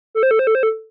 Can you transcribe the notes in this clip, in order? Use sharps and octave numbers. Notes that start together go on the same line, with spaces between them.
A4
C5
A4
C5
A4
C5
A4